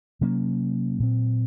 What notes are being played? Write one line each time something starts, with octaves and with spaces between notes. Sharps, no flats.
C3 F#3 A#3 C#4
A#2 F#3 C4